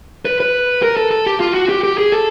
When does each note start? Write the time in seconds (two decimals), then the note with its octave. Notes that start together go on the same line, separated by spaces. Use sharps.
0.25 B4
0.40 B4
0.83 A#4
0.97 A4
1.11 A4
1.26 G4
1.40 F4
1.54 F#4
1.69 G4
1.84 G4
1.98 G#4
2.12 A4